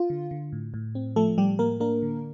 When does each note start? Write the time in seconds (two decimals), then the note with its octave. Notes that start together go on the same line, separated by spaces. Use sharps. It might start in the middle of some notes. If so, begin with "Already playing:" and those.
Already playing: F4
0.10 D3
0.31 D3
0.53 A2
0.74 A2
0.95 C4
1.16 F3 A3 A4
1.38 A2 G3 G4
1.59 A2 A#3 A#4
1.80 A#3 D4 A#4
2.02 D3